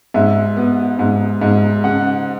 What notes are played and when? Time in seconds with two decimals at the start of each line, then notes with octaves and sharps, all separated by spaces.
0.14 G#2 E5
0.57 B3
0.99 G#2
1.42 G#2
1.84 C#3 F#5